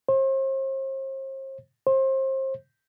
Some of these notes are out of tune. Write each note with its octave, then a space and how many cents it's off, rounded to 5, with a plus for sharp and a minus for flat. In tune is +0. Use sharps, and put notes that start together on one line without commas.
C5 +40
C5 +30